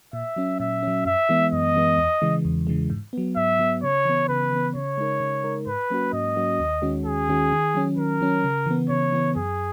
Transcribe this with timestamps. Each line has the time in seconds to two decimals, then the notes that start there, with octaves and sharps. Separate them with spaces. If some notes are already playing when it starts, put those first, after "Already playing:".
0.13 A#2 E5
0.36 F#3 C#4
0.60 A#2 E5
0.83 F#3 C#4
1.05 F#2 E5
1.29 E3 G#3 B3
1.52 F#2 D#5
1.75 E3 G#3 B3
1.98 E2
2.22 C#3 E3 G#3
2.45 E2
2.67 C#3 E3 G#3
2.90 G#2
3.13 F#3 B3
3.36 G#2 E5
3.59 F#3 B3
3.83 C#3 C#5
4.05 E3 B3
4.29 C#3 B4
4.51 E3 B3
4.75 C#3 C#5
4.97 G#3 D#4 A#4
5.20 C#3
5.44 G#3 D#4 A#4
5.67 G#2 B4
5.90 F#3 A#3 C#4 F#4
6.13 G#2 D#5
6.36 F#3 A#3 C#4 F#4
6.59 D#2
6.82 D#3 G#3 C#4 F#4
7.05 D#2 G#4
7.29 D#3 G#3 C#4 F#4
7.52 D#3
7.75 F#3 C#4
7.97 D#3 A#4
8.21 F#3 C#4
8.44 C#3
8.66 E3 B3
8.90 C#3 C#5
9.12 E3 B3
9.36 F#2 G#4